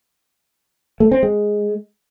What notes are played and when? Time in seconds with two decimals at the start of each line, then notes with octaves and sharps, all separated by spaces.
1.00 A3
1.11 C4
1.23 G#3